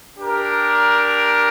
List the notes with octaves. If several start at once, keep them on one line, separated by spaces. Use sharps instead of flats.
D4 G4 A#4